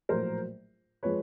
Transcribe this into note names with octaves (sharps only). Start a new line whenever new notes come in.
A#1 A2 F#3 A3 A#4 C5
F3 G#3 B4 C#5